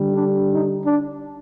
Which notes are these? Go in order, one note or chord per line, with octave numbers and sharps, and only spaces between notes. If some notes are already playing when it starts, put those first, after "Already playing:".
Already playing: D3 G3
D4
D#4
D4